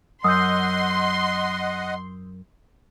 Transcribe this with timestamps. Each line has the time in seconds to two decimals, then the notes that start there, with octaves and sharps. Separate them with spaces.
0.24 F#2 D#5 F#5 C6 D#6 E6 G6